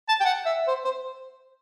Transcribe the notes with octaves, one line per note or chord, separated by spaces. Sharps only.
A5
G5
F#5
E5
C5
C5